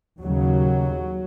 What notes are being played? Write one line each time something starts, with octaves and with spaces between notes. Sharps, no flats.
D#2 C#3 F#3